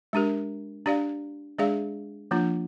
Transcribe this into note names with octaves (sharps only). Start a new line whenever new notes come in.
G#3 D4 G4 A#4
D4 G4 D5 F5
G#3 D4 G#4 D5 F5
F3 A#3 D4 F4